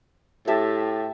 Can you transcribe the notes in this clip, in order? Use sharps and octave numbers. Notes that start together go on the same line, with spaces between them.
A2 G4 E5 A5